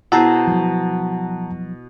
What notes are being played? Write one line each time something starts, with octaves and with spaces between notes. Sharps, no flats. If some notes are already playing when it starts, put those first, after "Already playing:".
B2 E4 G#4 C5 F#5 A5 A#5
F3 F#3